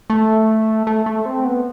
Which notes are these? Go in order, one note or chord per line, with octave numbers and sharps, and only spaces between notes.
A3
A3
A3
C4
B3